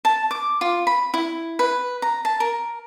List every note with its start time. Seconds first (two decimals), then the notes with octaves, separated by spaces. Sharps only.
0.05 A5
0.31 D6
0.61 F4
0.87 B5
1.14 E4
1.59 B4
2.02 A#5
2.25 A5
2.40 A#4